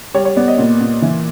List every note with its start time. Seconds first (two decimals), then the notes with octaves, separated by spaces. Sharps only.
0.14 G3 C#5
0.25 C#5
0.36 B3 D5
0.48 D#5
0.58 A#2
0.81 A#2
1.02 E3